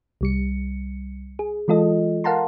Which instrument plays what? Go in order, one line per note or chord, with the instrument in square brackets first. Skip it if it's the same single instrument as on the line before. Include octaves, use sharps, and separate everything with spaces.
[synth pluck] C2 G3 C#7
G#4
E3 G#3 F4 A4 D#5
A#4 F5 F#5 A5 A#5 C6